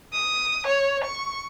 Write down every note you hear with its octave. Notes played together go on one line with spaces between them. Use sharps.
D#6
C#5
C#6